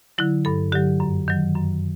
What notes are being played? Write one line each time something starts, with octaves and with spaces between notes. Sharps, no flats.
D3 F#3 E4
G2 A4
D3 F#3 G4
F#2
D#3 F#3
F#2